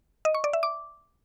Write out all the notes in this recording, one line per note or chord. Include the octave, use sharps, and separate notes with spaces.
D#5
C#6
D5
E5
D6